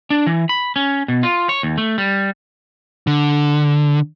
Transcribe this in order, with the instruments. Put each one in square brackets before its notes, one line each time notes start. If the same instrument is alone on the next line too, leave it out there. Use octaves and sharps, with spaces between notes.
[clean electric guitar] D4
E3
B5
C#4
B2
F4
C#5
D#2
A3
G3
[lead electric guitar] D3